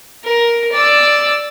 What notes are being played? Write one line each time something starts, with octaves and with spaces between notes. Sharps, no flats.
A#4
D5 E6